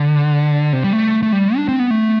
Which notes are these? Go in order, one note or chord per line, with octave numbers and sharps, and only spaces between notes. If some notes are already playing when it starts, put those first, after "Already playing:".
Already playing: D3
C3
G3
A3
A3
G3
D4
C4
B3
A3